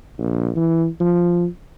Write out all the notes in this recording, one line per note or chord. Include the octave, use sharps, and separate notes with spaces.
A#1
E3
F3